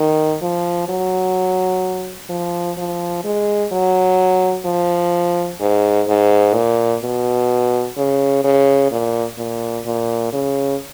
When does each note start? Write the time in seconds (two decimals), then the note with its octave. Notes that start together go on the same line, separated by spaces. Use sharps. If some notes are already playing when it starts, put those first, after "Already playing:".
Already playing: D#3
0.42 F3
0.89 F#3
2.30 F3
2.78 F3
3.24 G#3
3.72 F#3
4.66 F3
5.60 G#2
6.08 G#2
6.54 A#2
7.03 B2
7.97 C#3
8.44 C#3
8.91 A#2
9.38 A#2
9.86 A#2
10.33 C#3